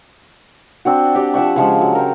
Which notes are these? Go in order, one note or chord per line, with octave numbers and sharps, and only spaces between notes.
C4 D4 F#4
G4 D5
F3 E5 F#5 C#6
C#3 F3 G#3
F#3
A#4 G5